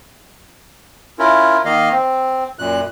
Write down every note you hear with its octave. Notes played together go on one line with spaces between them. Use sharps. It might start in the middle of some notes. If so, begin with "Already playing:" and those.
C#4 E4 F4 A#4
D#3 A#3 D#5 F5
C4
F#2 A#2 F#6